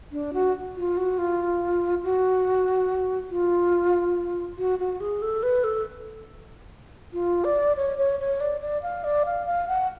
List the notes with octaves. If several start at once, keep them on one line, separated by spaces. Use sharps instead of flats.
D4
F#4
F4
F#4
F4
F#4
F4
F#4
F#4
G#4
A4
B4
A4
F4
D5
C#5
C#5
C#5
D5
D5
F5
D5
F5
F5
F#5